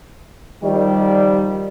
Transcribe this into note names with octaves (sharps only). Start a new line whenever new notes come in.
D#3 F3 G3